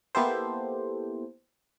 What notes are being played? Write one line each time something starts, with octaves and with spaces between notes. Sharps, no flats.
A#3 B3 E4 G4 A4 C5